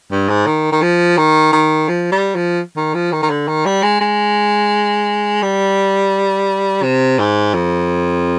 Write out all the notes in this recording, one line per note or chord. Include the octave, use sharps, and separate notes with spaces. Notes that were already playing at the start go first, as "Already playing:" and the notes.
G2
G#2
D#3
D#3
F3
D#3
D#3
F3
G3
F3
D#3
F3
D#3
D#3
D3
D#3
G3
G#3
G#3
G3
C3
G#2
F2